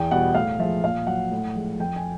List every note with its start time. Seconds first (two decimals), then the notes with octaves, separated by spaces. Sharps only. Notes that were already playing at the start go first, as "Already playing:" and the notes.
Already playing: E2 G5
0.11 B2 G3 F#5
0.34 A2 F5
0.59 F3 G#3 E5
0.84 A#2 F5
1.07 F#3 F#5
1.32 A2
1.55 F3 G#3
1.80 F2 G5
1.96 G#5